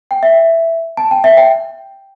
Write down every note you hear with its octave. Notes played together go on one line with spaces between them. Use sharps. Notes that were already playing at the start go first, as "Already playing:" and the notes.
G5
E5
A5
G5
E5
G5